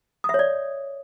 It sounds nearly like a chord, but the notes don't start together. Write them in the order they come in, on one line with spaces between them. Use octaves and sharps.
D#6 E5 C#5 D5